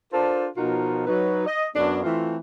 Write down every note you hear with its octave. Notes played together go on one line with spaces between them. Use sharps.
D4 F4 A4 A#4 C5
B2 F3 D#4 F4 F#4 A#4
F#3 D#4 B4
D#5
F#2 F#3 B3 D4
E3 A3 C4 F4